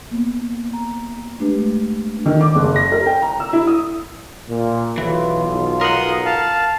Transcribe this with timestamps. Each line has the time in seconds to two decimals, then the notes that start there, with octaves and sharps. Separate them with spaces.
0.11 A#3 B3
0.73 A#5
1.39 G#3 A3 D4 G4 B4
2.26 D#3
2.41 D6
2.55 F#1
2.76 A#6
2.92 A#4
3.06 G5
3.22 A#5
3.40 E6
3.53 E4
3.67 D#6
4.49 A#2
4.98 B1 E3 F4
5.81 A#4 F#5 C6 D#6
6.26 F5 A5